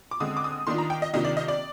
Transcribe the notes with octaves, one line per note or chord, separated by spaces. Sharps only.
D6
D3 G#3 C4 D#6
D6
D#6
D#3 A#3 D4 F4 C6
A#5
G5
D#5
C3 D#3 A#3 D4 F4 D#5
D5
D#5
D5